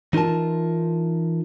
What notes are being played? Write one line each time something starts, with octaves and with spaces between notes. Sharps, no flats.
E3 D#4 F4 A#4 A5